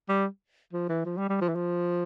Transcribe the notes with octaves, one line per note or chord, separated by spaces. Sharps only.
G3
F3
E3
F3
G3
G3
F3
E3
F3